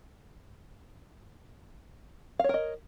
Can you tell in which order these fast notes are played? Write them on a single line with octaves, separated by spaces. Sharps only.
F5 C#5 A#4 D#5